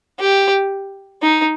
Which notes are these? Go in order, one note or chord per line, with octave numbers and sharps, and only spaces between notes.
G4
D#4